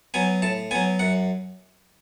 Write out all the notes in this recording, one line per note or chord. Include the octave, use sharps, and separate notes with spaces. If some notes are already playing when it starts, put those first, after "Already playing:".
F#3 B3 G#5
A2 A5
F#3 B3 G#5
F#2 F#5